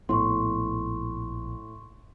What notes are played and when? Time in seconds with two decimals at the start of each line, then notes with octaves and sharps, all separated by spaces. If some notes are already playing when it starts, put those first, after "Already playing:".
0.09 A#1 A2 B3 C6 C#6